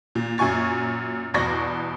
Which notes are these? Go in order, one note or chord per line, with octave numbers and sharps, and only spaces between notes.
A#2
F#2 A#2 G#5 C#6 A6
E2 G2 B2 D5 C#6 A#6